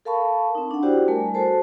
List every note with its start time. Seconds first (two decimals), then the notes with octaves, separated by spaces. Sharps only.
0.05 A4 A#4 F5 A5 B5 C#6
0.55 C4 D#4
0.71 D4 F#5
0.83 E4 F#4 G4 C5 D5 G5
1.08 G3 A3 A#4 G#5
1.34 F#4 A4 C5 A5